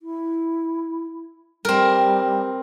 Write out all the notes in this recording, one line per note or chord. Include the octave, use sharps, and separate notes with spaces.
E4
G3 C4 A#4